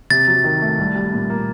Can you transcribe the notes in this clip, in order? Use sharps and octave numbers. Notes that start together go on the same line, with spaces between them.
C3 A6
F#3
D#3
A3
C2
G3
A#2
A#3